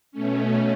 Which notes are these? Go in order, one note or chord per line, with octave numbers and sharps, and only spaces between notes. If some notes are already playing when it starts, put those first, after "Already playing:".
B2 A3 C#4